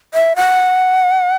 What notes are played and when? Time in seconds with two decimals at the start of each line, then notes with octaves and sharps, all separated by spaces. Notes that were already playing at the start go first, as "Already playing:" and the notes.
0.14 E5
0.36 F#5